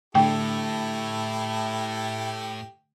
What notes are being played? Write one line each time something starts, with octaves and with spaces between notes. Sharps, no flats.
A2 D3 A3 E4 G4 A4 G5